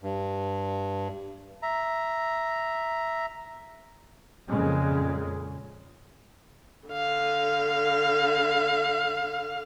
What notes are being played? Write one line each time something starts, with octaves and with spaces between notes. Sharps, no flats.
G2
E5 A#5
F2 A#2 C#3 G#3
D3 F5